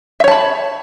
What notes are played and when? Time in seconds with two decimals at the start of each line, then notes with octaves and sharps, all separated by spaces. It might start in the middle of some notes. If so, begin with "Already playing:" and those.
0.20 E5
0.24 C#5
0.28 A5
0.31 B5